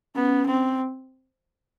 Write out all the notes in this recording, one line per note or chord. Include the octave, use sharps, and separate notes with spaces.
B3 C#4
C4